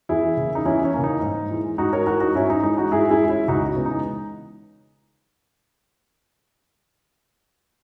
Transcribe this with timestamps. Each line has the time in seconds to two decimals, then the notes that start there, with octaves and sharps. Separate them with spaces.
0.09 E2 E4 G#4
0.37 C#3 E3 A#3
0.55 D#4
0.66 E2 C#4 E4
0.84 C#4
0.94 C#3 E3 A#3
1.04 D#4
1.22 G#2
1.51 E3 G#3
1.78 G#2 D#4 F#4
1.93 A#4 C#5
2.06 E3 G#3 F#4 A#4
2.20 D#4 F#4
2.35 G#2 C#4 E4
2.50 D#4
2.63 E3 G#3 D#4
2.77 D#4 F#4
2.91 G#2 E4 G#4
3.10 E4 G#4
3.20 E3 G#3
3.29 C#4 E4
3.48 C#2 D#4 F#4
3.76 C#3 E3 G#3 B3
3.86 D#4